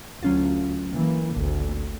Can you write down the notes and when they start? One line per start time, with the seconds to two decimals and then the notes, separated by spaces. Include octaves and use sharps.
0.23 D2 F#3 C#4 F4
0.92 E3 A#3
1.36 G#1 D2